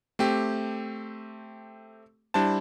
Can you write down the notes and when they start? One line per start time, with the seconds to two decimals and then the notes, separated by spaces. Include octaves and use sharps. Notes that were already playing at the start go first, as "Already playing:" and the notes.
0.19 A3 C4 G4
2.34 G3 D4 E4 C5 A5